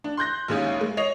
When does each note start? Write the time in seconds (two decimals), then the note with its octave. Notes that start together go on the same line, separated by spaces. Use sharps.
0.04 D4
0.17 C6 F#6 G6 A#6
0.48 A#1 D#2 G#3 C#4 G#4 F5
0.81 G#3
0.97 C#5 D#5 C7 F7